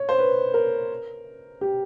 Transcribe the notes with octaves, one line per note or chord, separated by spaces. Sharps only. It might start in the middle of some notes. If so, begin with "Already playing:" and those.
Already playing: C#5
C5
B4
A#4
G4